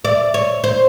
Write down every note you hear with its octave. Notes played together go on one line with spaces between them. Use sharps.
D5
C#5
C5